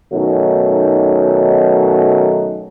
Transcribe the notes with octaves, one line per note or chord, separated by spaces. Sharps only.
B2 D#3 F#3 A3 C#4 D#4